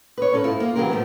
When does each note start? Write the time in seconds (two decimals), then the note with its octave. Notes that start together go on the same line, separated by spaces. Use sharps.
0.18 B4 C#5
0.32 G#2 C#4 A4 B4
0.44 G#2 E4 F4
0.60 A#3 F4
0.76 E3 F#3 F4 G4 G#4 A#4
0.90 A2 F3 A3 B3